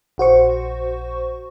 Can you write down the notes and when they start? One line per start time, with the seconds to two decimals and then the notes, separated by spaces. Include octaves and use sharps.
0.18 A#1 F#4 C5 C#6